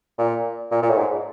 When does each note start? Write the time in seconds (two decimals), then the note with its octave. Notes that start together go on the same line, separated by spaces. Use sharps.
0.19 A#2
0.71 A#2
0.82 A#2
0.89 A2
0.98 G#2